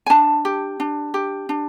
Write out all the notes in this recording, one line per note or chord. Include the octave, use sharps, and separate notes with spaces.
G#5
D4 A5
G4
D4
G4
D4